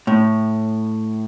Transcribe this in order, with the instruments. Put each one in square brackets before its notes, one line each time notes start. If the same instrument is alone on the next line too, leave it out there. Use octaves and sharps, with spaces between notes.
[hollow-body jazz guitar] A2